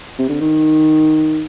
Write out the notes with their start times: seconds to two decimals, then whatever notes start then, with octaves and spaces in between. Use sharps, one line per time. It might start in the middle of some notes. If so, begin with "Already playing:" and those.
0.19 C3
0.29 D3
0.41 D#3